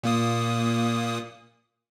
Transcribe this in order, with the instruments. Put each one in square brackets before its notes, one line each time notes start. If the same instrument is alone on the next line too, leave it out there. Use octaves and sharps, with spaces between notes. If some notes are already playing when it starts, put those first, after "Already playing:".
[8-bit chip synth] A#2 A#3 D#6